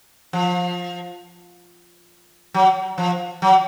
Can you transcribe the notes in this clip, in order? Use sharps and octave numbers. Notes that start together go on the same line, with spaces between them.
F3
F#3
F3
F#3